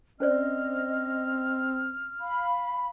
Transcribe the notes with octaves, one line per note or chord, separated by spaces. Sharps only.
C4 C#4 C5 D5 D#5 F6
F5 B5